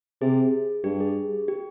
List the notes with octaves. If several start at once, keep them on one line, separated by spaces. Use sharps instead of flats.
C3 G#4
G2 G4
G#4
G4